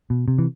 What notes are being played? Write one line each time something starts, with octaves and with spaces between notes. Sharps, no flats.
B2
C3
E3